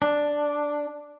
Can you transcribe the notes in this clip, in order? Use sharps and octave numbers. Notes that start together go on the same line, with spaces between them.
D4